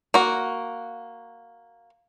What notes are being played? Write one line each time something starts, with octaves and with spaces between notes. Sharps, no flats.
A#3 F#4